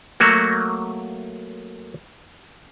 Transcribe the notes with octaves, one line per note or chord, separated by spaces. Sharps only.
F#3 A3 A#3 F#4